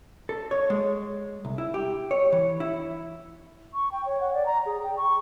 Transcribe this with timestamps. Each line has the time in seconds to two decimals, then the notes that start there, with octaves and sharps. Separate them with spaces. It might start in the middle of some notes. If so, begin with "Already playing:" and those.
0.29 A4
0.51 C#5
0.70 G#3
1.45 C2
1.58 E4
1.74 G4
2.11 C#5
2.32 E3
2.60 E4
3.74 C#6
3.92 G5
4.06 C#5
4.21 F#5
4.34 D5
4.46 A#5
4.66 G#4
4.83 G5
4.97 C#6